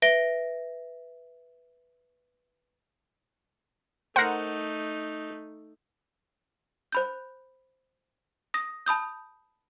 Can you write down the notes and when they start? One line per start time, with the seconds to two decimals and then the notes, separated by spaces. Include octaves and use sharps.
0.02 B4 E5 A#6 D7 G7
4.16 A3 D#4 A#4 C5 F#5
6.92 C5 B5 G6
8.54 D#6 A#6
8.86 A5 B5 D#6 G6